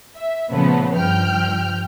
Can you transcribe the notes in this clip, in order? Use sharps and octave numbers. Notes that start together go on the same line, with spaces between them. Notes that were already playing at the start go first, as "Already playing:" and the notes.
E5
A#2 C#3 F3 A3 B3 C#4
G2 F3 G5 F6 G6